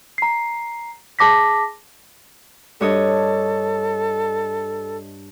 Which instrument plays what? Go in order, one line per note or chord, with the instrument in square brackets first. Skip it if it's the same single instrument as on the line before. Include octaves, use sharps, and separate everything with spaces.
[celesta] A#5 C7
G#4 A5 D6 A#6 B6
[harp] G2 C#5 D#5 [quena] A4